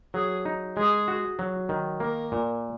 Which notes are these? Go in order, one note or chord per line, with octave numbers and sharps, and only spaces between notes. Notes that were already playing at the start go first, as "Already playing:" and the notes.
F#3 G#4
D#4
G#3 G#4
F#4
F#3
D#3
A#3 A#4
A#2